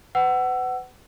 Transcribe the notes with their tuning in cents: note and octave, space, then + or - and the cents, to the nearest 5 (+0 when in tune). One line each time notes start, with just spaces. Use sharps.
B4 +40 F#5 +20 E6 +20